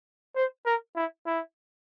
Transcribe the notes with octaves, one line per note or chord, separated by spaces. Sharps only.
C5
A#4
E4
E4